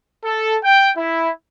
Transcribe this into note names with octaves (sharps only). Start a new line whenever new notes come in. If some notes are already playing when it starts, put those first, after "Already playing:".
A4
G5
E4